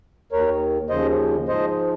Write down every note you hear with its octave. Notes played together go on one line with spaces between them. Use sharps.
D#2 D#3 A#4 C#5
D#2 C#3 F3 C5 D#5
G#2 F3 C5 D#5